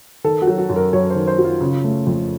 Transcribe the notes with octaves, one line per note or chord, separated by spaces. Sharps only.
D#3 A4
F#4
F#3
F#4
F#2
A#4
F#2 C#5
D#3 C5
C5
F#3
F4
C#3
A3
F2